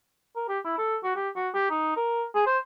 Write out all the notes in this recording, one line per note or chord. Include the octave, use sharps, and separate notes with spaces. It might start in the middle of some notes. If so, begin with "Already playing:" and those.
A#4
G4
E4
A4
F#4
G4
F#4
G4
D#4
A#4
G#4
C5